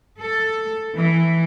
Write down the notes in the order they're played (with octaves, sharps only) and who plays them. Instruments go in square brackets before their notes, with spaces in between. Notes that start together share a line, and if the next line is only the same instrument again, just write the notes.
[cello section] A4
E3